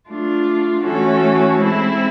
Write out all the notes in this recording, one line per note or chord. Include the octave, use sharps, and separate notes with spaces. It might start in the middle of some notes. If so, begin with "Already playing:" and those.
A3 D4 F4
E3 A3 C#4 F#4 A4
G#3 C4 E4